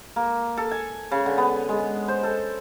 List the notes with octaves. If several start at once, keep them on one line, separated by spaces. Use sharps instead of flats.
A#3
A4
G#5
C#3
D3
B3
G#3
C5
A4